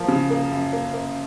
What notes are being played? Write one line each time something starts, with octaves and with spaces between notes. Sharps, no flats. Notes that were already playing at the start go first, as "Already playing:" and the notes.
Already playing: F3 A#3
C#3
A#3
F#2
A#3
A#3